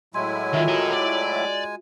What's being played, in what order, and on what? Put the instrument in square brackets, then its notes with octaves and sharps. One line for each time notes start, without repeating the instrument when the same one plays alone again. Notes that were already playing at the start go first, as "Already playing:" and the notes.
[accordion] A2 F#3 E4 [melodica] G#3 G#5 [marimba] C6
[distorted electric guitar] D#3 [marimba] F4 E5
[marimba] F#4 [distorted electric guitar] A#4 D#5
[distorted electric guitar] D5